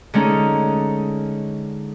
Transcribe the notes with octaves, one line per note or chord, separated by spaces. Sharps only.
D3 G#3 C#4 D#4